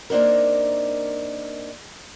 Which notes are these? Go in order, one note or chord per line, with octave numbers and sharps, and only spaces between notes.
A#3 C4 D4 D#4 A#4